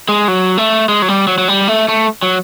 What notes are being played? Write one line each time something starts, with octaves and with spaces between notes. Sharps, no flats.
G#3
F#3
A3
G#3
F#3
G3
F#3
F#3
G3
A3
A3
F#3